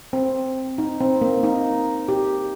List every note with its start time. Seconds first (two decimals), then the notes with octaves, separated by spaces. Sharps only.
0.13 C4
0.78 D#4
1.00 C4
1.21 A#3
1.43 D#4
2.08 G4